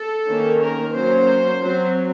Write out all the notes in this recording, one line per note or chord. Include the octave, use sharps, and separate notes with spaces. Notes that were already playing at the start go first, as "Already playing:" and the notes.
Already playing: A4
D#3 A#3 C#4
A#4
F#3 A#3 C#4 C5
F#3 C4